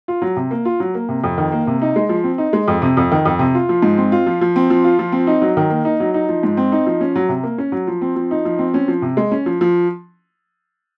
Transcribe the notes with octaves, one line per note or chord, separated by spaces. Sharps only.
F4
F#3
C3
A#3
F4
F#3
A#3
C3
F2
D#3
A#3
C3
D#4
G#3
F3
C4
D#4
G#3
F2
C3
F2
D#3
F2
C3
F4
F3
G#2
C4
F4
F3
F3
C4
F3
F4
F3
C4
D#4
F#3
D#3
A#3
D#4
F#3
D#4
F3
G#2
C4
D#4
F3
C#4
F#3
C3
A#3
C#4
F#3
F3
C4
F3
D#4
F3
C4
C#4
F3
C3
G#3
C#4
F3
F3